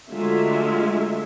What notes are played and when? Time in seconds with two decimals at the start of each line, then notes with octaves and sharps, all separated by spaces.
0.11 D3 F#3 G#3 A3 F4 E5